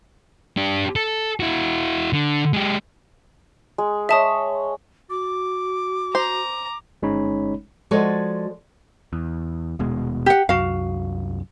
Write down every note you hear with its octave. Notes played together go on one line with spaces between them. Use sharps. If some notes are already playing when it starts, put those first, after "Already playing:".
D4 G4
A4
E4 F#4
D3
G#3 G4
G#3
C#5 D#5 E5 A5 D#6
F#4 D6
C5 A#5
G1 G#3 C#4 D#4 C#5 B5
F3 G#3 F#4 A4 C#5 D5
E2
D#1 B2 G#3
G4 F#5
C2 F#2 F#4 F5